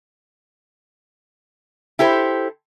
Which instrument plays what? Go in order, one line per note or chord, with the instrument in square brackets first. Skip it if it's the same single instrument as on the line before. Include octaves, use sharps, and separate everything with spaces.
[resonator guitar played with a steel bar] E4 G4 A4 C5